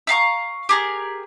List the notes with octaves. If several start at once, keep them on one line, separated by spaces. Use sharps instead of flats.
E5 F5 A#5 C#6
G4 G#4 A#4